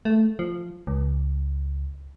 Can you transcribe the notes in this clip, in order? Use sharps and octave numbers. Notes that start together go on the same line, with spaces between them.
A3
F3
C#2